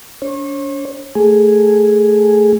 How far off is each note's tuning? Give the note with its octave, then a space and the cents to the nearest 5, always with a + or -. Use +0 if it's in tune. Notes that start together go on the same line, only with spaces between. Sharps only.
D4 -45 C#5 -40
A3 +0 G#4 +0